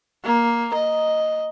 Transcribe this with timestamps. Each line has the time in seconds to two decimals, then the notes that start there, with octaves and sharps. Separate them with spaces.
0.25 A#3
0.75 D#5